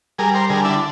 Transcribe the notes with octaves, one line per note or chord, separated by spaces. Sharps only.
G3 G#4 A#4
A#4 C5
D3 G#4 A#4
D4 E4